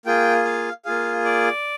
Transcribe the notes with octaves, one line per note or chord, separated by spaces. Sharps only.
A#3 F4 G#4 G5
F5
A#3 F4 G#4 F5
D5